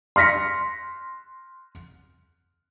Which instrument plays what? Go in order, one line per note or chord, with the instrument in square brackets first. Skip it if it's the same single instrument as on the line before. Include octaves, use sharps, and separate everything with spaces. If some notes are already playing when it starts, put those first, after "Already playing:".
[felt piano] C6 F6 A#6 B6 C#7